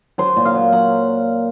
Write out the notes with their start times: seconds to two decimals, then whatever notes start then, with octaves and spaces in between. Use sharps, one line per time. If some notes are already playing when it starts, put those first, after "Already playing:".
0.18 F#3 C5
0.37 A#2
0.45 F5
0.55 F#3
0.72 F#3 F#5